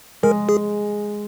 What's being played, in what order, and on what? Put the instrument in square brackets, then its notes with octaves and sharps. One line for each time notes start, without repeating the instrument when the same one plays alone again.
[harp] G#3 [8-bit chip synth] A#4
[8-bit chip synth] G#4